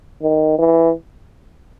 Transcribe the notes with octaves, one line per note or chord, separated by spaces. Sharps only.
D#3
E3